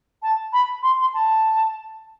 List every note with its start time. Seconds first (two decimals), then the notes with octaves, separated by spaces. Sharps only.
0.23 A5
0.53 B5
0.83 C6
1.01 C6
1.14 A5